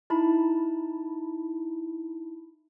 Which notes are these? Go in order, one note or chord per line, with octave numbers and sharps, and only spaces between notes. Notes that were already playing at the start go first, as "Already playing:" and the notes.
D#4 E4 A5 B5